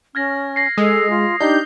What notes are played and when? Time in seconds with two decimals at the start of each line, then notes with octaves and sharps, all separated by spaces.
0.15 C#4 F6 G#6 A#6
0.56 A#6 C7
0.78 G#3 A4 D#6
1.10 F4
1.40 D4 D#4 G4 G6